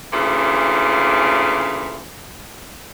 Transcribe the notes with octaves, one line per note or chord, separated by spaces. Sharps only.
D2 A#2 C#3 E3